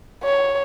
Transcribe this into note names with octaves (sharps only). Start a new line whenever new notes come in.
C#5